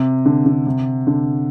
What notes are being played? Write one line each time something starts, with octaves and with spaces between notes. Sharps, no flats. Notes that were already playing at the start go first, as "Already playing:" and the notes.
Already playing: C3
D3
D3
C3
D3